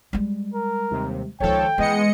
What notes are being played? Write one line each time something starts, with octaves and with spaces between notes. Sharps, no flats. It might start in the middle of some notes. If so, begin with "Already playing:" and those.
G3 G#3
A#4
D#2 C3
C#2 D#3 F3 A4 C#5 G5
E3 G#3 B3 D#5 C#7